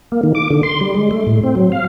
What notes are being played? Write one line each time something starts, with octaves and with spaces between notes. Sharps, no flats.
A#3
D#3
D6
D3
C6
G3
G#3
A3
A2
C4
F#3
F5